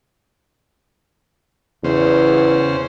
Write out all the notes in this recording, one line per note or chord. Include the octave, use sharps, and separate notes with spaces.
E2 C#3 C5